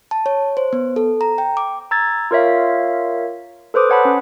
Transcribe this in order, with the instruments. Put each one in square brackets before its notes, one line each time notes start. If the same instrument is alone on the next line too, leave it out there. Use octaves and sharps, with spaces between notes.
[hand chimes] A5
C#5
C5
B3
A4
A#5
G5
D6
[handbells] A#5 E6 G#6 A6
F4 A#4 C#5 E5 F5
A4 B4 C5 D6 D#6
C#5 F#5 A5 B5
C#4